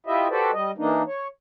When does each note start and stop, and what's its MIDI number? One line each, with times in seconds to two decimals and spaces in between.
0.07 0.28 64
0.07 0.28 65
0.07 0.28 67
0.07 0.28 75
0.07 0.28 76
0.29 0.51 66
0.29 0.51 67
0.29 0.51 69
0.29 0.51 71
0.29 0.51 72
0.29 0.51 74
0.52 0.71 55
0.52 0.71 75
0.78 1.03 52
0.78 1.03 58
0.78 1.03 62
0.78 1.03 63
1.07 1.28 73